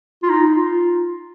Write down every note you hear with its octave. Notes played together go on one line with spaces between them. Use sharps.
F4
D#4
F4